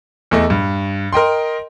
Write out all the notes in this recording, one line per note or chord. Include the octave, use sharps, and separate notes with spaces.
E2 A3 D#5
G2
A#4 D#5 G5 C6